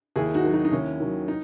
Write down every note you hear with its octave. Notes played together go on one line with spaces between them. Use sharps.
D#2 E4 G#4
D#4 F#4
D#3 F#3
D#4 F#4
D#4
D#2 C#4 E4
D#3 F#3
D#4